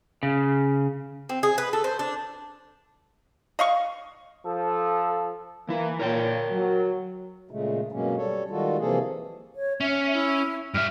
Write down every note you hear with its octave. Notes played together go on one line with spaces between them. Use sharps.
C#3
C4
G#4
B4
A4
C5
D4
D#5 F5 C#6
F3 A4
E3 A#3 E4
A#2 A#4 C#5 G5
F#3
A#2 C#3 G#3 A3
G2 B2 F#3 G#3 A#3 C#4
G3 A4 C#5
D#3 G3 G#3 F4 F#4 A4
C3 E3 F3 A#3 G#4 A4
C#5
C#4 E5
E4
G2 E5 F6